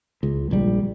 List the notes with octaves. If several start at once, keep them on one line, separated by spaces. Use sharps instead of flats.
C#2
A#1 G3